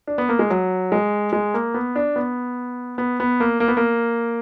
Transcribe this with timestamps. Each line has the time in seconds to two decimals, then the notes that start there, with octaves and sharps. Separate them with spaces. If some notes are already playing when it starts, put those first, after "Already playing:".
0.07 D4
0.18 B3
0.29 A#3
0.39 G#3
0.50 F#3
0.92 G#3
1.33 G#3
1.54 A#3
1.74 B3
1.96 D4
2.16 B3
2.98 B3
3.20 B3
3.40 A#3
3.60 A#3
3.68 B3
3.77 A#3